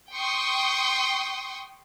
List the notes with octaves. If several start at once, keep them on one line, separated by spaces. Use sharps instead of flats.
G5 C6 C#6 D#6